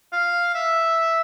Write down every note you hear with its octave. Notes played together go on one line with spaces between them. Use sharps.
F5
E5